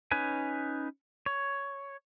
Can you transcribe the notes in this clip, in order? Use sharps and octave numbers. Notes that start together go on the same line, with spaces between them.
C#4 D#4 B4 G#5
C#5